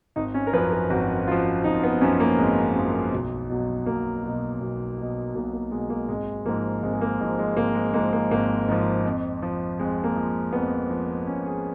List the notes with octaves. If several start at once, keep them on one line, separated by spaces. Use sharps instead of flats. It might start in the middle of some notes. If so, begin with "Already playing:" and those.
G#1 D#4
C#4
A#4
F#2 F3 B4
A#4
G#1 F#4
F#2 F3 F4
G#1 D#4
B3
F#2 F3 C#4
A#3
G#1 G#3
F#2 F3
B1
B2 F#3
B1 A#3
B2 F#3
B1
B2 F#3
B1 A#3
A#3
B2 F#3 G#3
A#3
G#1 G#3
G#2 F3 A#3
G#1 G#3
G#3
A#3
G#2 F3 G#3
G#3
G#1 A#3
G#3
G#2 F3 A#3
A#3
G#1 A#3
G#2 F3
F2
F3
F2 G#3
A#3
F3
F2 B3
F3
F2 C#4
G#4